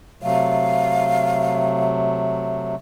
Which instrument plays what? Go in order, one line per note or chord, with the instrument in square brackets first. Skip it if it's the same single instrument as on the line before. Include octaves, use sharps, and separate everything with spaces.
[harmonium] C3 F#3 A3 [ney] F5